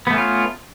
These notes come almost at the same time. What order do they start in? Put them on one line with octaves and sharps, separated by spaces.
B3 A3 C#4 F4